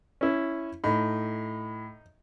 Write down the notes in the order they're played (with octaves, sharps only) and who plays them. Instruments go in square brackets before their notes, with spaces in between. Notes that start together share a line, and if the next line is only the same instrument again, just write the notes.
[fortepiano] C#4 E4
[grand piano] A2 [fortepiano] D#4